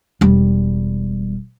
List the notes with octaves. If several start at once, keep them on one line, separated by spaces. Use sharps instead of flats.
E1 G3